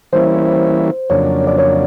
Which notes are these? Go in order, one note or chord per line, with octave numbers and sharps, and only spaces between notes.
E3 G3 A#3 C#4 E4 C5
F2 C#3 F#3 A#3 D4 C#5
D5
C#5